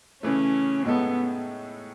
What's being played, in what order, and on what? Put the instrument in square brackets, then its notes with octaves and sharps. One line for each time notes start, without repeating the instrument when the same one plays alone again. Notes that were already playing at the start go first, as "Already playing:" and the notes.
[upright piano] C#3 E3 A3 [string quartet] C#4
[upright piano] A2 G#3 D#4 A4 [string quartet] B3